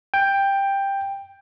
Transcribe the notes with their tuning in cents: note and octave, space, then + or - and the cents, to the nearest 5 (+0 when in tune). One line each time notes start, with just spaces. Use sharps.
G5 +10